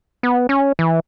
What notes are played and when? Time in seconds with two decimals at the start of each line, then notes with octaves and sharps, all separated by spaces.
0.23 B3
0.49 C#4
0.79 E3